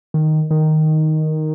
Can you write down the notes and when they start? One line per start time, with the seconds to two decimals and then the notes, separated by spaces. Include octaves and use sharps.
0.14 D#3
0.51 D#3